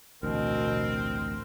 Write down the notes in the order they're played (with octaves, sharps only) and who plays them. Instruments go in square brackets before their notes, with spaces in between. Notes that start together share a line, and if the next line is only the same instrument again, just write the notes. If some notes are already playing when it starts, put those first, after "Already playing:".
[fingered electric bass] A1 D2 [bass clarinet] B2 [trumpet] C4 [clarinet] A#4